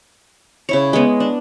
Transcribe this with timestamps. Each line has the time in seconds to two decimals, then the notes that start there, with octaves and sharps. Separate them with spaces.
0.69 C#3 E4 C#5
0.93 G#3 B3
1.20 D4